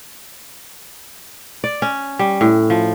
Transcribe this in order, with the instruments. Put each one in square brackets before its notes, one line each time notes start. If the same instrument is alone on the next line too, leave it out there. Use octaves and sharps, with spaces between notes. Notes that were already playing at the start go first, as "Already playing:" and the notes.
[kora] D5
C#4
G3
A2
F3